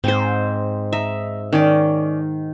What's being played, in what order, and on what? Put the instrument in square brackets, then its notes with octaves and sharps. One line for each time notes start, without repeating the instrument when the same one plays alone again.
[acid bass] G#2 [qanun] C4 C5
[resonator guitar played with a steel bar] D#4 [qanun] E5
[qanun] D#3 [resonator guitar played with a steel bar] C#4 C#5 D5